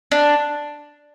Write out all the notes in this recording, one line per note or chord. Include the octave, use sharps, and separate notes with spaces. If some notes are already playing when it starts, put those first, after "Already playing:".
D4